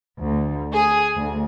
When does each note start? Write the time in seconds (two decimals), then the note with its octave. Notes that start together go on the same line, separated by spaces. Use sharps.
0.22 D2
0.73 G#4
1.17 D2